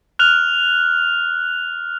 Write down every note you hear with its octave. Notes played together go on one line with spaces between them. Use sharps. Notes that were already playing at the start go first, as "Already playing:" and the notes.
F6 F#6 F7